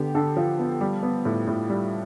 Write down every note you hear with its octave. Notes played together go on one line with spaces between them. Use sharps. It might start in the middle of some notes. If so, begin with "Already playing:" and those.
Already playing: D3 B3 G4
D3 A4
F3
B3
G3
B3
A2
A2
G3